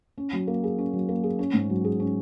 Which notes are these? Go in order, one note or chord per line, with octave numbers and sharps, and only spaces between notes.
C#4
F#3
A#3
G#4
C#4
F#3
A#3
G#4
C#4
G#2
F#3
G#4
C#4